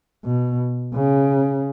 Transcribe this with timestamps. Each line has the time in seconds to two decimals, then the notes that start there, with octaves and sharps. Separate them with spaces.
0.25 B2
0.94 C#3